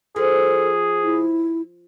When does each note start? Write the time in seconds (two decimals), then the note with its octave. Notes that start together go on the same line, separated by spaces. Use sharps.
0.16 F3 G#4 A4
1.04 E4